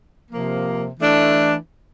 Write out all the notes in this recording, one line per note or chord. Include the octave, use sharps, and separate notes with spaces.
C3 F3 A#3
E3 A3 D4